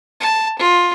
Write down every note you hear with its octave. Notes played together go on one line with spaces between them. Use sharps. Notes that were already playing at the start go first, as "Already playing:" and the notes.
A5
F4